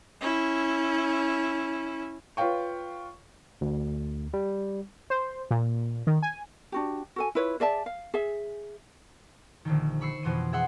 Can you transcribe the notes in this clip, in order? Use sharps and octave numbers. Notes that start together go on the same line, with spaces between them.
C#4 E4
F4 B4 C#5 F5 G5 C#6
D2
G3
C5
A#2
D#3
G#5
D4 F#4 G4
F#4 A4 G#5
E4 F4 B4 C#5
G#4 D5 E5 A5
F5
G#4 E5
A#1 D3 D#3
B5 C#6 E6 C7
F2 B2 E3 C6 D#7
G#4 E5 F#5 C6